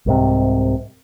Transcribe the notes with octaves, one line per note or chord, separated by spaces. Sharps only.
C2 G#2 C3